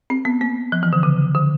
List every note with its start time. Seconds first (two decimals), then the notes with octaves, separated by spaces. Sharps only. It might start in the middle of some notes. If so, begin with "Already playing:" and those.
0.10 C4
0.25 B3
0.41 A#3
0.72 F3
0.83 E3
0.93 D3
1.03 C#3
1.35 D3